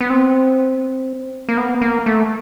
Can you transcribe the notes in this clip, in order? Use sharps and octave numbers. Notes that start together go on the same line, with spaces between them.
B3
C4
A#3
B3
A#3
A3